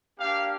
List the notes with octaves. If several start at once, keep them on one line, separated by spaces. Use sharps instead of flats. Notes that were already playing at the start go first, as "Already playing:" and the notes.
A#3 D4 G4 F5